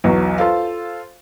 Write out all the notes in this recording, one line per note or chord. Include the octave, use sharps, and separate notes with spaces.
B1 E2 F#3
F4 A4 C5 F5